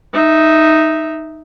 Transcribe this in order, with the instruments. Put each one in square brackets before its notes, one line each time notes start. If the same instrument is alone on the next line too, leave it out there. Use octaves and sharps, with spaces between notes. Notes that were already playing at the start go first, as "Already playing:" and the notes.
[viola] D#4 E5